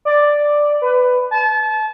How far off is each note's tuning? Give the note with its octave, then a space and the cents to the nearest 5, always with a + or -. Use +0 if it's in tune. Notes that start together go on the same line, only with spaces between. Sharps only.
D5 +5
B4 +15
A5 -30